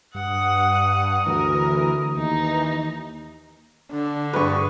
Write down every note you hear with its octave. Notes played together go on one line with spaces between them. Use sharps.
G2 F#5 D#6
D2 E3 A#4
D#2 E3 D#4
D3 D4
G2 G#4 B4 C#6